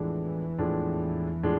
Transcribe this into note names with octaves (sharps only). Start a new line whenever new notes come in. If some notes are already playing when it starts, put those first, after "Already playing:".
Already playing: E2 A2 E3 F3 G#3 D4
A2 F3 G#3 D4
A2 F3 G#3 D4